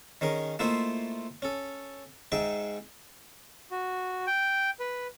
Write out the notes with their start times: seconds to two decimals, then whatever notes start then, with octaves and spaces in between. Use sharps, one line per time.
0.21 D#3 C#4 G#4 A#4
0.59 A3 A#3 E4 F4 C5 D#5
1.42 C#4 A4
2.32 G#2 D#4 G#4 E5 G5
3.71 F#4
4.27 G5
4.80 B4